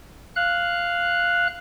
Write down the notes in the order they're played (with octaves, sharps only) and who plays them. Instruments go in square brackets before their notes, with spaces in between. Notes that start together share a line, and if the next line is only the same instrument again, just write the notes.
[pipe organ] F5 F#6